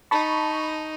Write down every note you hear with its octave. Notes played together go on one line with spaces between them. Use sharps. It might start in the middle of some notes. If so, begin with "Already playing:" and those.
D#4 A5 B5 C#6